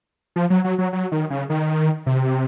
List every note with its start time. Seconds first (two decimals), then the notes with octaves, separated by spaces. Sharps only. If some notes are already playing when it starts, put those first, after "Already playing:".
0.36 F3
0.50 F#3
0.64 F#3
0.78 F#3
0.93 F#3
1.12 D#3
1.30 C#3
1.50 D#3
2.06 C3